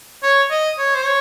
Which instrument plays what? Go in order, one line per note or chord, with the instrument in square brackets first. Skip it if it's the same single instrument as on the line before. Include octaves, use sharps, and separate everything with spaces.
[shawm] C#5
D#5
C#5
C5
C#5